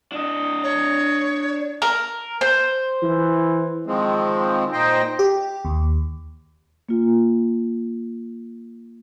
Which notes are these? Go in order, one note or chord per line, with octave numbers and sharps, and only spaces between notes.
D4 D#5
C#5
A#4
C5
E3
D#3 F3 G#3 C4
A#2 D#4 C5 D#5 G5
G4
D#2
A#3 F4